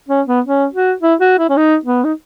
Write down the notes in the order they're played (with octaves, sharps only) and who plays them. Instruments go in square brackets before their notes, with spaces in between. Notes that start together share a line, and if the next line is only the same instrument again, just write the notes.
[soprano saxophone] C#4
B3
C#4
F#4
E4
F#4
E4
C#4
D#4
B3
D#4